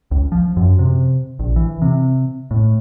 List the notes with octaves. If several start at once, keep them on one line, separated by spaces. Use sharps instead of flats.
C#2
F3
F#2
C3
A#1
E3
C3
A2